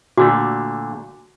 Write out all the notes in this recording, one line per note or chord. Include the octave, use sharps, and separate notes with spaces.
A#2 D3 A3 F#4